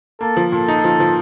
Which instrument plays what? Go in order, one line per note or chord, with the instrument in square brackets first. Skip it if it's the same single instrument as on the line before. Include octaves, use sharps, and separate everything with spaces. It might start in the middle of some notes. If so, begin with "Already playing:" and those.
[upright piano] A#3 [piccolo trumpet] A4
[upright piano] F3
[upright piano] A#2 [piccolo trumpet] A4
[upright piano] D#4
F3
F3